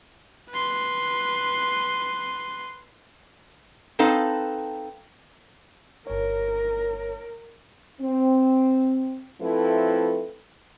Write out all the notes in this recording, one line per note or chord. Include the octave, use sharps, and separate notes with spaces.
B4 C6
C4 D#4 A4 B4 F5
G1 A#4 C#5
C4
F3 A3 C4 E4 A4 B4